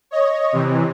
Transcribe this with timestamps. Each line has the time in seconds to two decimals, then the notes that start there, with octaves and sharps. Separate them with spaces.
0.11 C#5 D#5
0.53 C3 E3